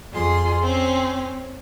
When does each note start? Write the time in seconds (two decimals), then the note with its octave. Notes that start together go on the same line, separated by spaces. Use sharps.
0.11 F2 F4 G#4 C6
0.61 C4 C#4